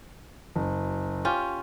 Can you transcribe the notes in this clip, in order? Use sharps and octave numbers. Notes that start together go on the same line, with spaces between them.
F#1
C#4 F4 G4